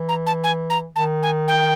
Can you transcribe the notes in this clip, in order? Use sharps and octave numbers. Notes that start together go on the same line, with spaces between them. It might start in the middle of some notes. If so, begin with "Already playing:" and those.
Already playing: E3
A#5
A5
G#5
A#5
D#3 A5
G#5
G5